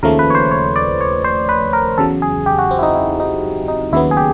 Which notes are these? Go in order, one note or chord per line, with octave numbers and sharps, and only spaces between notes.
D#2 C#3 F3 A3 A#4
B4
C#5
C5
C#5
D5
C#5
C5
B4
A#4
E2 C#3 F#3 A4
G#4
G4
F#4
C4
E4
D#4
E4
D#4
D#4
D#2 C#3 F#3 B3 E4
G#4
G4